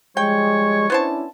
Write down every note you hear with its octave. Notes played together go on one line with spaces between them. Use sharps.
F3 G3 G#3 C#5 G5
B3 C#4 D4 E4 C5 A5